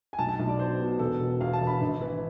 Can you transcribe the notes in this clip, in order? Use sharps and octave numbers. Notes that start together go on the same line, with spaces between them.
G#5
B1 A5
A5
B1
D5
B2 C5
B2
E1 A4
B2
E2 F5
A5
E1
B5
G#1
E3